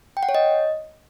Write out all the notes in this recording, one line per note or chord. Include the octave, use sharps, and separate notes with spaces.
G5
F#5
C#5
D#5